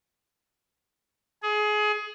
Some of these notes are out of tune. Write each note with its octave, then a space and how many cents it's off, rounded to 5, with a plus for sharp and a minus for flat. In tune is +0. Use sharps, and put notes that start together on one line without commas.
G#4 +25